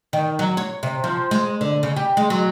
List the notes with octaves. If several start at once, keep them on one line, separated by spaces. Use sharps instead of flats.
D#3
F#3
C#5
C3
F3
G#3
D3
C#3
G4
G#3
F#3